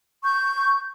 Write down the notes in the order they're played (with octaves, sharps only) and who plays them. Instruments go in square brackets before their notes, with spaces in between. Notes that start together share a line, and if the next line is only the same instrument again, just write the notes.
[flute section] C#6 G6